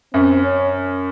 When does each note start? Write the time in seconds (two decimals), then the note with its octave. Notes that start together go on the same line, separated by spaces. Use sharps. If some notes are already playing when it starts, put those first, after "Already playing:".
0.13 F#2 C4
0.43 C#4